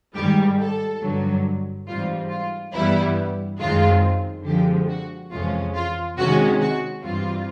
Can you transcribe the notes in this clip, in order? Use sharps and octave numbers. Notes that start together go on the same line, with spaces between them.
G#2 D#3 G3 G4
A4
G2 D3 F#3
G#2 E3 G3 C4 F4
F4
G2 E3 G3 B3 E4
F#2 D#3 G#3 C4 F4
D3 F3 G#3 C4 G4
F#4
F2 C3 E3 G#3 C#4 F4
F4
C3 D#3 G#3 C#4 F#4
F#4
G2 E3 G3 C4 F4